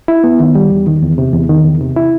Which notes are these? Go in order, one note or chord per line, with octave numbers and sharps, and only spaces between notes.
E4
B3
D#3
G3
E2
D#3
E2
C3
E2
D#3
E2
C3
E4